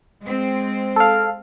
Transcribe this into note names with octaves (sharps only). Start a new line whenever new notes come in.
G#3 C4
A4 F5